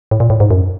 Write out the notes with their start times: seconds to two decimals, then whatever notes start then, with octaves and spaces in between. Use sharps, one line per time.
0.11 A2
0.20 A#2
0.30 A2
0.40 G#2
0.51 F#2